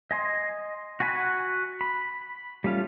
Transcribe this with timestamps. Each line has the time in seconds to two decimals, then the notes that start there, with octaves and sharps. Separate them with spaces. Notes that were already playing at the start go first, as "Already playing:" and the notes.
0.11 D#5 G#5 C6
1.00 F#4 F#5 G#5 B5
1.81 B5
2.64 G3 A3 C#4 F4